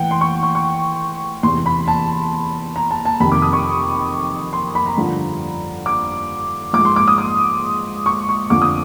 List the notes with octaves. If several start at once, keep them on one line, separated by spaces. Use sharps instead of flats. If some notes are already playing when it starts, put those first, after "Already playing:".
Already playing: A2 E3 F#5 G5
C6
C#6
C#6
C#6
E2 C3 E3 C6
B5
A5
A#5
A5
A5
F2 C3 D#3 B5
D6
D#6
C#6
C6
B5
A#5
G2 D3 F3
D6
G#2 F3 D6
C6
D6
D#6
D6
C#6
C#6
F2 D3 F3 D6
D#6